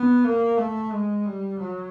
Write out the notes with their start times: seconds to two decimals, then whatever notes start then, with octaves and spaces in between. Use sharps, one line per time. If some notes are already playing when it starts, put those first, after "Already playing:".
Already playing: B3
0.24 A#3
0.57 A3
0.92 G#3
1.25 G3
1.59 F#3